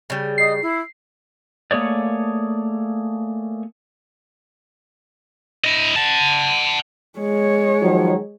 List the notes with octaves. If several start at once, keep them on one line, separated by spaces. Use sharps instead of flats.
C#3 G3
D#5 C7
E4
A3 A#3 G#4 C#5 D5
E4 D#5
F#5 A5
G#3 C#5
D#3 F3 F#3